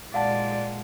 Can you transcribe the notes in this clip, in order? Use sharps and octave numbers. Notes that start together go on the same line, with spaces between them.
A#2 G#3 D5 F5 F#5 A5